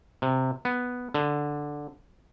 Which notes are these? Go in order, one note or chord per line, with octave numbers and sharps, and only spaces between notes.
C3
B3
D3